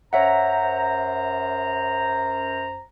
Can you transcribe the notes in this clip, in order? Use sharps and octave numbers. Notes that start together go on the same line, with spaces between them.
F#2 C5 C#5 E5 F#5 A#5